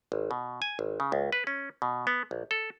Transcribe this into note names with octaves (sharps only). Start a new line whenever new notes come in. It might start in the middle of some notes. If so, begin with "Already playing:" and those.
G#1
B2
G#5
G#1
C#3
C#2
B4
C#4
B2
B3
A#1
A4